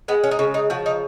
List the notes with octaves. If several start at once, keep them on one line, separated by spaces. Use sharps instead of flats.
G#3 B3
C#4
D#4
C#3 C#4
D#4
F3 F#4
D#4